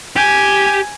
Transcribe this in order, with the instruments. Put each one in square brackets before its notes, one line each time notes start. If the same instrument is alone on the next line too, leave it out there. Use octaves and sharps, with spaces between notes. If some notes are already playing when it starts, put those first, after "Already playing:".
[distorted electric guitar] G4 [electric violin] G#5